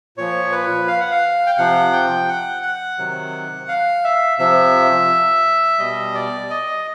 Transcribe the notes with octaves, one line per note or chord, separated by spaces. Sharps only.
A#2 F3 C#5
B4
F5
F#5
F5
G5
C3 F3 F#5
G5
F#5
F#5
C3 D#3 F#3
F5
E5
C3 F3 E5
B2 G3 D#5
D5
D#5